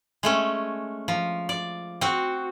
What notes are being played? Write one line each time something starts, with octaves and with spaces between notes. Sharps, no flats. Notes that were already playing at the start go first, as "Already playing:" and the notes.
G#3 A3 C#4
F3
D5
C4 F#4